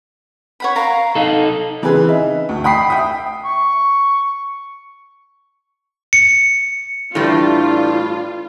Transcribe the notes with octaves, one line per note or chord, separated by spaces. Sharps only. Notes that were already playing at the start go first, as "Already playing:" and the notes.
C#5 F#5 B5
A#4 F5 A#5
D#4 A4
C#3 E3 C4 G#4 B4
D#4 E5
D2
G5 B5 D#6 B6 C7
E5 G5 D#6
C#6
C#7
A2 E3 G3 D4 F4